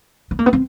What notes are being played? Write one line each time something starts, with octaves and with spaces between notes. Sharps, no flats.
B3
A#3
B3
C4